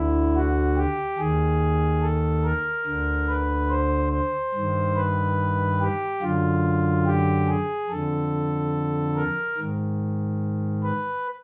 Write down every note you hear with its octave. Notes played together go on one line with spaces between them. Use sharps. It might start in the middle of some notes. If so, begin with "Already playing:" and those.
Already playing: D2 D3 E4
F#4
G4
D#2 D#3 G#4
A4
A#4
D2 D3
B4
C5
C5
G2 D#3
B4
G4
F#2 D3 F4
G4
G#4
F2 D3 A4
A#4
G#2 D#3
B4